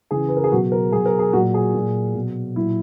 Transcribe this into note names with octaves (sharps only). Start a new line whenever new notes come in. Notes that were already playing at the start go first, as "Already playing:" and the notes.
C#3 E3 G#4
B4
A#4
G#4
B2 F#3 F#4
A#4
B2 F#3 G#4
A#4
G#4
A#2 F#3 F#4
G#4
A#2 F#3
B2 F#3
A#2 F#3 E4